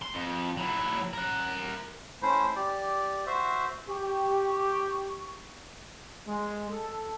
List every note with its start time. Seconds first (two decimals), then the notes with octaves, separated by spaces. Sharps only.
0.02 C6
0.14 F2
0.57 F#3 E4
1.13 A#4 F#5
2.22 A3 C#4 E4 C5
2.56 G4 D5
3.26 F#4 C5 E5
3.88 G4 C#6
6.27 G#3
6.69 A4